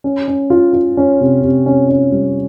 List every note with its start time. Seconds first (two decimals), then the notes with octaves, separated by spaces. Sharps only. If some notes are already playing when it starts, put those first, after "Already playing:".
0.04 C#4
0.28 C#4
0.50 F4
0.73 F4
0.97 C#4
1.21 C3
1.43 C3
1.66 C#4
1.89 C#4
2.12 G3